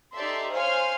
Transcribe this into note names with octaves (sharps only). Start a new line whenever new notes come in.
D#4 G4 A4 D5 E5 C6
C5 C#5 F5 G#5 C6 F6